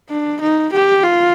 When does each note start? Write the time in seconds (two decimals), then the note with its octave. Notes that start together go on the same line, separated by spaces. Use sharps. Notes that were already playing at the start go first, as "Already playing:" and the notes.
0.10 D4
0.41 D#4
0.73 G4
1.03 F4